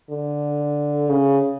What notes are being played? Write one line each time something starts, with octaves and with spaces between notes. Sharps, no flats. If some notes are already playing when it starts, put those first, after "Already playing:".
D3
C#3